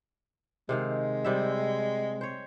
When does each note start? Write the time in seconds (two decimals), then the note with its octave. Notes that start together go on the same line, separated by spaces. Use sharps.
0.69 C3 D#3 G#3 F5
1.24 C3 G3 E5
2.21 C5 C#5